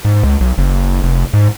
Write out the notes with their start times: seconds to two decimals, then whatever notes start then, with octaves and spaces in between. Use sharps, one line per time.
0.05 G#2
0.23 C#2
0.40 B1
0.58 F#1
1.03 F1
1.33 G#2